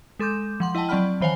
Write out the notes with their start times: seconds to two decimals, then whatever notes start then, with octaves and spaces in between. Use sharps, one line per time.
0.19 G#3 A4 C6 D6 G6
0.60 F3 F#5 C6
0.75 E4 D#5 F#5 G5 A5
0.89 F#3 C4 D5 F#5 B5 F6
1.21 D#3 E3 C5 C#5 F5 G#5